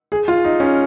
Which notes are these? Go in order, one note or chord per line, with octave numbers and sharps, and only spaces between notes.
G#4
F4
D#4
C#4